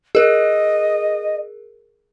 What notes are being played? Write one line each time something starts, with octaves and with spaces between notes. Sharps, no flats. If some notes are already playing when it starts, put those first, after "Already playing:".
G#4 A#4 D#5